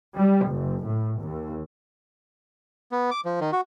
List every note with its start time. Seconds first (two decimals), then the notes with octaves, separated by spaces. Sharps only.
0.18 G3
0.49 F#1
0.86 A2
1.21 D#2
2.92 B3
3.11 D6
3.25 F3
3.41 D#3
3.52 F#4